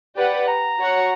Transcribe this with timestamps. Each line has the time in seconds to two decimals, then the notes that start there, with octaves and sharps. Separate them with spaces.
0.17 G4 B4 D5 F#5
0.48 A#5
0.79 F#4 C#5 F#5